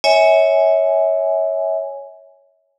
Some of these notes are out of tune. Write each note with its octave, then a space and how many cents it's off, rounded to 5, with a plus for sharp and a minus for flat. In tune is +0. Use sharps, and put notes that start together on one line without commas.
C#5 +0 E5 -30 G#5 +0